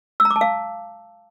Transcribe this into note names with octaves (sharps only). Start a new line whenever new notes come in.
E6
A#5
D6
A5
F5